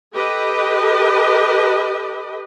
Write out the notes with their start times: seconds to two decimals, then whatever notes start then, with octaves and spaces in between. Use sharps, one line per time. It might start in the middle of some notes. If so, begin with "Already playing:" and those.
0.14 G4 A4 B4 D#5